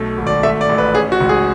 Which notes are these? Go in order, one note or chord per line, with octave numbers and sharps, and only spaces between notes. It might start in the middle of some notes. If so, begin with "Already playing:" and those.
Already playing: B1 A3
G#1
D5
A3 E5
D5
A1
B4
C#4 G#4
F#4
C#2
G#4